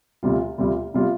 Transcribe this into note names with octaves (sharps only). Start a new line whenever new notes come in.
D2 C3 G3 F4
D2 C3 G3 F4
C3 G3 F4